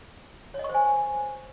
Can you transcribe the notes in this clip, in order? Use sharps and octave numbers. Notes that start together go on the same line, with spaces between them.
C#5
D#5
C#6
C5
G#5